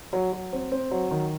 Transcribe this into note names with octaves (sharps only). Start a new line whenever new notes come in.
F#3
F#3
C4
C4
F#3
D#3